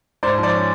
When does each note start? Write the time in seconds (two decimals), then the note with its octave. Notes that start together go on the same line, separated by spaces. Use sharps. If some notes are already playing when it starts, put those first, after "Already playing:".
0.23 G#2 C5 D5
0.38 F3
0.43 C5 D5
0.53 C#4